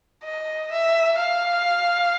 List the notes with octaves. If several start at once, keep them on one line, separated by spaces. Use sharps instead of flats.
D#5
E5
F5